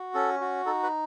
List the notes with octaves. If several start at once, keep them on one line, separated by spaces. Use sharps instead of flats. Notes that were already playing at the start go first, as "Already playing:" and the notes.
Already playing: F#4
C#4 A4
F#4
D#4 A4
B4